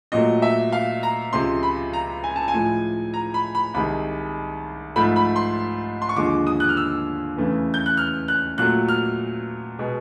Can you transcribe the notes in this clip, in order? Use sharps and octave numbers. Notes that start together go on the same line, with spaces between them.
A#2 F#3 A3 D#5
E5
F5
A#5
C#2 C3 F3 G#3 C6
B5
A#5
G#5
A5
G#5
A2 F3 G#3
A#5
B5
B5
C2 C3 D#3 G#3 B5
G#2 F3 A3 B5
B5
C6
C6
C#6
D#2 D3 F3 G#3 D6
D#6
F#6
F6
E6
E2 C#3 E3 A3
G6
F#6
F6
F#6
A#2 F#3 A3 F#6
F6
B2 G#3